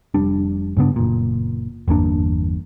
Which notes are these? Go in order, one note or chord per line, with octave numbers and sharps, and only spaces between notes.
F1 G3 D4
G2 C#3 B3 D4
F#1 A#2
G1 E2 A#3 D4